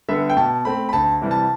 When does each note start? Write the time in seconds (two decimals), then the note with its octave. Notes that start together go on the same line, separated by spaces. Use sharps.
0.09 D3 G3 B3 E5
0.30 G5
0.37 B2 A5
0.65 A3 C4 B5
0.89 B5
0.93 D2 A5
1.22 C3 E3 G3
1.31 A5